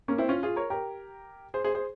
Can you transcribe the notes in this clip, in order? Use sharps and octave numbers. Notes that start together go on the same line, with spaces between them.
A#3 C#4
C4 E4
C#4 F4
F4 G#4
A#4 C#5
G4 A#4
G#4 C5
G#4 C5
G#4 C5